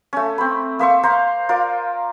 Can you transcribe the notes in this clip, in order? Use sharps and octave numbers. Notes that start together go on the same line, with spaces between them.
A3 C#4
C4 B5
A#3 E5 C6 C#6
C5 F5 A#5 C6
F4 A#4 D5